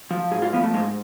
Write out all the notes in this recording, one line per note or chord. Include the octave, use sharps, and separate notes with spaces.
F3
G#2 G#4
F4
F3 B3
A3
G#2 G#3